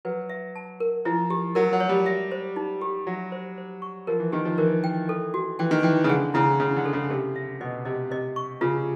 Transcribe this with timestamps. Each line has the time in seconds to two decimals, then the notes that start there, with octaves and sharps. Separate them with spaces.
0.05 F#3 B4
0.30 E5
0.56 A5
0.80 A#4
1.05 F3 E4
1.30 G4
1.55 F#3 A#4
1.73 F#3
1.80 C#5
1.89 G3
2.06 E5
2.32 C5
2.56 D#4
2.81 G4
3.07 F#3 E5
3.32 C5
3.58 C5
3.82 C#6
4.07 F3 A#4
4.20 E3
4.32 D#3 G4
4.45 F3
4.58 E3 A#4
4.84 G5
5.09 A4
5.34 F#4
5.59 E3 G5
5.71 D#3
5.83 E3 G5
6.04 C#3
6.09 D3 G#4
6.34 C#3 E4
6.60 C#3 C#4
6.76 D3
6.86 A4
6.93 C#3
7.10 C3 A4
7.36 E5
7.60 B2 D#5
7.85 C3 D#5
8.11 C3 D#5
8.36 C#6
8.61 C#3 F4